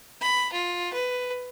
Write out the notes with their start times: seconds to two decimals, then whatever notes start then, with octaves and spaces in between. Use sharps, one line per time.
0.21 B5
0.52 F4
0.93 B4